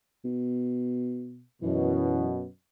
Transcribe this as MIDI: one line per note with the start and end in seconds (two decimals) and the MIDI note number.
0.24 1.44 47
1.62 2.45 42
1.62 2.45 47
1.62 2.27 52